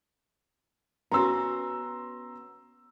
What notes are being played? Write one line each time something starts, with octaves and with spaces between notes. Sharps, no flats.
B3 C#4 F#4 A#5 C6 E6